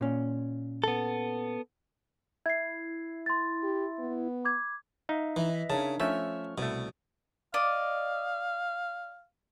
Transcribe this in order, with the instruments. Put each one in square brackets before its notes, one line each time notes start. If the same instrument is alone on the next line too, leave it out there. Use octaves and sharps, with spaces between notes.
[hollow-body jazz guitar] A#2 C#4
[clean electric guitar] B3 A4
[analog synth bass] E4 [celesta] G#6 C7
[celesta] C6 A6
[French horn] G4
B3
[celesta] B5 D6 G#6
[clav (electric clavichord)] D#4 F5 [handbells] E5
[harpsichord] E3 [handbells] B4 D#5
[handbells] E5
[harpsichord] C#3 [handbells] D4 D#4 A#4 [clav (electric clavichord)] A5
[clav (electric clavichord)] F3 A3 C#4 [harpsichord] E5 [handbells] C#6 F6
[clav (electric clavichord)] C2 A3 [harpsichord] B2
[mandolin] D5 D#5 [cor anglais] F5